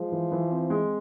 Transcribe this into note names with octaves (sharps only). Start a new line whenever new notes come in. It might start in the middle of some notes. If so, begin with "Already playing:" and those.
Already playing: F3 G#3
E3
E3
C4
G#3